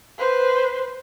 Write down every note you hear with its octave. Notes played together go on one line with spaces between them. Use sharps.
B4 C5